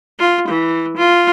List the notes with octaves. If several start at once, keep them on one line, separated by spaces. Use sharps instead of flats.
F4
E3
F4